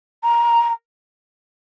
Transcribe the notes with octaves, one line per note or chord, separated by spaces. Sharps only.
A#5